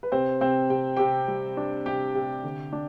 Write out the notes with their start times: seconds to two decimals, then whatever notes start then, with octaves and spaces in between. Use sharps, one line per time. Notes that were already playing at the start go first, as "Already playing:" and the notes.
0.03 B4
0.12 C3 C4 C5
0.41 C3 C4 C5
0.70 C3 G5
0.96 C3 G4 G5
1.28 G3
1.57 D4
1.86 C3 G4 G5
2.15 C3
2.44 D3
2.73 D4